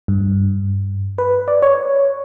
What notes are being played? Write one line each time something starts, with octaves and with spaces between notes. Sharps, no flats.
G2
B4
D5
C#5